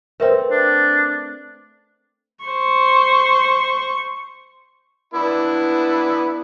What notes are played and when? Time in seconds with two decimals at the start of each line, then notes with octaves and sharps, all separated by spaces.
0.20 A3 C4 A#4 B4 E5
0.51 D4
2.45 C5 C#6
5.14 B3 D4 E4